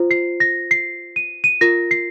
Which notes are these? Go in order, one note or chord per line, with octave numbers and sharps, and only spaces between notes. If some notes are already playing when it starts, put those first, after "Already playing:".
Already playing: F4 C5
C7
A#6
C7
D#7
D#7
F4 A#4 A#6
C7